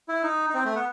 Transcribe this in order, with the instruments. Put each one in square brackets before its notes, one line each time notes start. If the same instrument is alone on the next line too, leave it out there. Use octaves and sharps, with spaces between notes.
[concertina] E4
D#4
D#4
C4
A3
B3